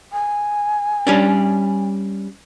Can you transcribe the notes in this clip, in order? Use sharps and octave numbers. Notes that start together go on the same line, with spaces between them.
G#5
G3 C#4 D4